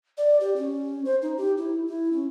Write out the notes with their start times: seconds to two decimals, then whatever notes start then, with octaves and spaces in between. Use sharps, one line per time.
0.17 D5
0.40 G4
0.56 C#4
1.05 C5
1.22 D#4
1.38 G4
1.57 E4
1.87 E4
2.12 C#4